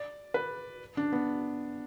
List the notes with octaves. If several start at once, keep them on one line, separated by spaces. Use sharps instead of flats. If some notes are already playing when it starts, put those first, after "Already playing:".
Already playing: D5
B4
D4
B3